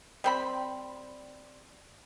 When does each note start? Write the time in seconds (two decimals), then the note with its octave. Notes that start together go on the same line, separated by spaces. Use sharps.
0.24 G3 C4 B5